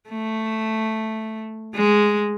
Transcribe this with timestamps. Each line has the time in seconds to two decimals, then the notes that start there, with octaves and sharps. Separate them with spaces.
0.10 A3
1.75 G#3